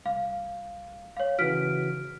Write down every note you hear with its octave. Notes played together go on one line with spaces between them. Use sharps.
C2 F5
C#5 F5
C#3 E3 F#4 F6 B6 D7